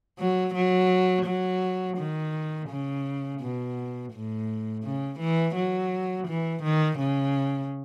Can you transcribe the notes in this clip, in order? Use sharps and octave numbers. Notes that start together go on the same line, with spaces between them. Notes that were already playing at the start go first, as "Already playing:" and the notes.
F#3
F#3
F#3
D#3
C#3
B2
A2
C#3
E3
F#3
E3
D#3
C#3